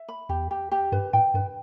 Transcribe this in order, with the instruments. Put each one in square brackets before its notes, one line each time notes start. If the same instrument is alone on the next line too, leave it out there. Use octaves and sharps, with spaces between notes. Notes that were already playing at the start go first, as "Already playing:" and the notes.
Already playing: [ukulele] E5
B5
[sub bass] E2 [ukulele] G4
[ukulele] G4
G4
[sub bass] G2 [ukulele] B4
[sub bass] A2 [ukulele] G5
[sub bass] G2 [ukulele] B4